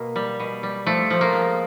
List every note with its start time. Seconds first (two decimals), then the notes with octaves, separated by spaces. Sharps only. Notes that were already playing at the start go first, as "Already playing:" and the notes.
Already playing: B2 A#3
0.16 G3
0.40 B2
0.63 G3
0.86 F3 A3
1.10 F3
1.21 A#3
1.33 G#3